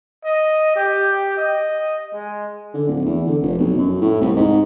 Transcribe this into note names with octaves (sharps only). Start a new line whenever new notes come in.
D#5
G4
D#5
G#3
D3
D1
E2
D3
F1
B1
F#2
A2
C2
G#2